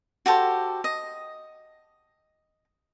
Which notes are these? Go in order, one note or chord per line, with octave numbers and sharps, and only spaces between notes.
F#4 G4 A4 C5
D#5